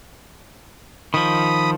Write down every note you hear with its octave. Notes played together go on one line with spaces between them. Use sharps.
D#3 F3 B5 D#6